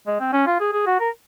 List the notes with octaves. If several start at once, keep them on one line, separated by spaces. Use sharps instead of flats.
G#3
C4
C#4
F4
G#4
G#4
F#4
A#4